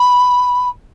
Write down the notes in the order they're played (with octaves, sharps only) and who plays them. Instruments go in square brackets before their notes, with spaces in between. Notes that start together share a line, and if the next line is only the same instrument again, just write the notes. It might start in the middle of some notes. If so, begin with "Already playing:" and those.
Already playing: [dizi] B5